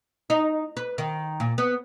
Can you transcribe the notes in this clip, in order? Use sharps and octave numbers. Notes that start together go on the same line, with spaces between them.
D#4
B4
D#3
A#2
B3